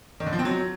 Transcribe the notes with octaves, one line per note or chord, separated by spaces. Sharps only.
D#3
D3
F3
C4
F#3